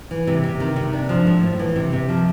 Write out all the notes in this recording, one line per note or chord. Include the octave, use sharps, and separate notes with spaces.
E3
C3
C3
D#3
C3
D4
F3
A2
A2
E3
C3
C3
F3